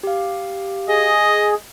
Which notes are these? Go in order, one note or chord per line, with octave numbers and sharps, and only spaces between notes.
G4 F5
G#4 D#5